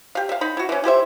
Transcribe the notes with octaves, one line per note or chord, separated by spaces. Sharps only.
G4 F5
E5 F5
D#4 B5
E4 F#4
E3 C#4
E4 G4 C5 E5